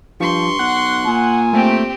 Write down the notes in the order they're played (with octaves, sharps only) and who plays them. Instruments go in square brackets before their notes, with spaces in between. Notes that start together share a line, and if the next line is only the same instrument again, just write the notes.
[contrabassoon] G2 [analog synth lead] F3 [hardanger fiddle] C6 C#6
[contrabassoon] B1 [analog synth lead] F#5
[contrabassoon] A#2 [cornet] G#5
[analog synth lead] A3 [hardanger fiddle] C4 G4